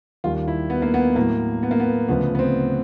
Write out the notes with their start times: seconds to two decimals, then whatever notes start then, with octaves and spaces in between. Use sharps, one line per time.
0.24 D#2 D#3 G3 F4
0.48 E4
0.70 B3
0.82 A#3
0.94 B3
1.16 A2 F#3 A#3
1.63 B3
1.71 A#3
1.80 B3
2.09 D2 C#3 F3 B3
2.35 B3
2.39 C4